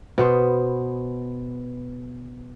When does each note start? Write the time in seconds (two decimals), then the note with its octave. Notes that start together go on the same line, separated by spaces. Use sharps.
0.18 B2 B3 C5